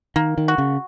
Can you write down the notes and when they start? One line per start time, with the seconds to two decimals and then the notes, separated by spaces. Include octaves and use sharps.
0.16 D#3 A#3
0.38 D#3
0.48 F#4
0.58 C#3